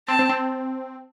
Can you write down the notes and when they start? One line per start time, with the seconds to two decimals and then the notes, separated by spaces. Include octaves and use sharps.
0.08 C4 A5
0.19 C4
0.29 C4